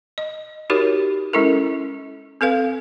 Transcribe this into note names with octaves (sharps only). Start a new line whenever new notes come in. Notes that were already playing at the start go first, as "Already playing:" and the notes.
D#5
D#4 F#4 G4 A#4 C#5
G#3 C#4 E4 A4 A#4
C4 A4 B4 F5